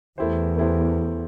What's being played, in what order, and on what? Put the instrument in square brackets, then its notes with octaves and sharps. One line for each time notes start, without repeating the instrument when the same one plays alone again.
[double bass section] E2 [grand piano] A3 E4 G4 C5
[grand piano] A3 E4 G4 C5